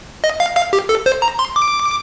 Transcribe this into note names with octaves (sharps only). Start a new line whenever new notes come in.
D#5
F5
F5
G4
A4
C5
A#5
C6
D6